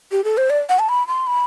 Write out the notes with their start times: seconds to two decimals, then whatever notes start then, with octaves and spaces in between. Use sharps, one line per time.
0.12 G4
0.24 A4
0.37 C5
0.50 D5
0.69 F#5
0.79 A5
0.89 B5
1.08 C6
1.27 B5